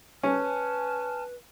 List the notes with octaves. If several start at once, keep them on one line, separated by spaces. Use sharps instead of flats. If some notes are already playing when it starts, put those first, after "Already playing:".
C#4 B4 G#5 A5 F6